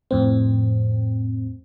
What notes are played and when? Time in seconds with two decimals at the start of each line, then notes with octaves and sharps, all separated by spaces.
0.11 F2 A2 C4